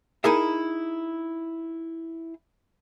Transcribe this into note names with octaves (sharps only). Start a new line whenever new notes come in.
D#4 E4 G#4 A#4 E5